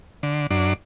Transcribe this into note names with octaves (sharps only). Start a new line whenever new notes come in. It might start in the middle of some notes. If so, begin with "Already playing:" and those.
D3
F#2 D4